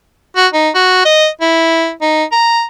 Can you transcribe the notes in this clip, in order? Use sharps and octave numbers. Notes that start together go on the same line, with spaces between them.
F#4
D#4
F#4
D#5
E4
D#4
A#5